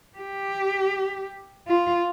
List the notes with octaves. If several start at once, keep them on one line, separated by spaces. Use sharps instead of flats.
G4
F4